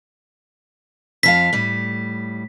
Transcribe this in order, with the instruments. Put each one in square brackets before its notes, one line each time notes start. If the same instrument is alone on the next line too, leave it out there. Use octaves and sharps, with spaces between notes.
[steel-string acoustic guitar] F2 F3 F5 [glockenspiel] B6
[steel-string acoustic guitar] A2 G3